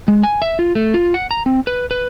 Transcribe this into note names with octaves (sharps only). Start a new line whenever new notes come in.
G#3
G#5
E5
F4
A3
F4
F#5
A#5
C4
B4
B4